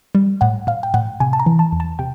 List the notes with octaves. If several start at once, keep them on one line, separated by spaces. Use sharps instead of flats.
G3
A2 F#5
A2 F5
G5
A2 F#5
C3 G#5
A5
A#5
E3
A5
E2
A5
C3 G5